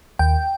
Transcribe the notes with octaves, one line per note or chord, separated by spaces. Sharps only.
D#2 G5